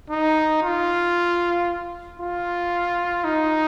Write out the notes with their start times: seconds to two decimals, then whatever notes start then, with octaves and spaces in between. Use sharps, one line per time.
0.10 D#4
0.62 F4
2.20 F4
3.24 D#4